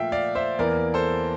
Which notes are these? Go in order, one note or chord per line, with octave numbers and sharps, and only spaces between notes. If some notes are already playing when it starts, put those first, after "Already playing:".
Already playing: A#2 F3 A3 E5 F5 G5
D5 F5
C5 E5
E2 E3 A#3 A#4 D5
A4 C5